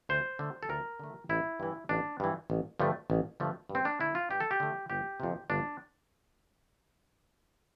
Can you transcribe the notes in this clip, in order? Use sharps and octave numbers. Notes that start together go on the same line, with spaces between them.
D2 C5
D3 A3
A4
D2 A#4
D3 A3
A1 E4
G2 E3
A1 D4
G2 E3
A1
G2 D3 F3 A3
A1
G2 D3 F3 A3
G2
C4
D4
D3 A3 E4
F4
G2 G4
A4
G4
D3 A3
G1 G4
F2 C3
G1 D4